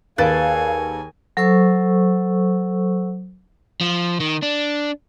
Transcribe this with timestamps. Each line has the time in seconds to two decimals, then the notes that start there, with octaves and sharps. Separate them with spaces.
0.18 D#2 G#4 A4 B4 D5 F5 G#5
1.37 F#3 A4 C5 C#6 E6
3.81 F3
4.20 D#3
4.42 D4